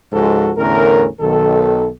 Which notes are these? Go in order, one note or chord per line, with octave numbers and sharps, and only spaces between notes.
C#2 G#2 F3 G#3 F#4 A4
E2 A2 D3 C#4 A#4
B1 D#3 A4